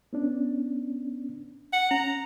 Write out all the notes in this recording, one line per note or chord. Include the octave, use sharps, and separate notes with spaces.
B3 C#4 D4
F#5
C#4 A#5